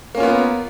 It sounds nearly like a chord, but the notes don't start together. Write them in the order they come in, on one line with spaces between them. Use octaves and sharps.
A#3 C#4 F4 B3